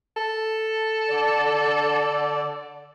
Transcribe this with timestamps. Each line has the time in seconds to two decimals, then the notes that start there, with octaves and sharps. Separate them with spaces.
0.17 A4
1.09 D3 D5